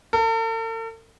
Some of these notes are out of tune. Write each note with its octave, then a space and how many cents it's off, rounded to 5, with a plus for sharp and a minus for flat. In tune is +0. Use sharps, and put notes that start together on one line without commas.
A4 +45